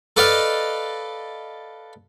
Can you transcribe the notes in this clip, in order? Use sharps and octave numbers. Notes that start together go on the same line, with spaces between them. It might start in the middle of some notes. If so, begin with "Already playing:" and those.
A4 B4 D5 D#5 F5